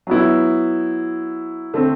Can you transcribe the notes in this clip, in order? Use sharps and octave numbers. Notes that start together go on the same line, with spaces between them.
F#3 B3 E4
D3 A3 C4